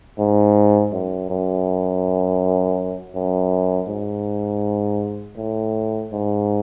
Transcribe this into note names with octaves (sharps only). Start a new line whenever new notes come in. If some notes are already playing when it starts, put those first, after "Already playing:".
G#2
F#2
F#2
F#2
G#2
A2
G#2